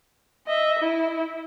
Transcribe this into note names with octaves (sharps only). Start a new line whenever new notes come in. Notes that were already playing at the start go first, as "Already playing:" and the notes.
D#5 E5
E4